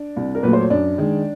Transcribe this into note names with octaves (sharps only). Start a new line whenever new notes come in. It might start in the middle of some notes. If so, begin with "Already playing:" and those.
Already playing: D4 D5
C2
A#4
A#2 F#3 A3 B4
C5
C#5
F#2 D4 D5
D#3 G#3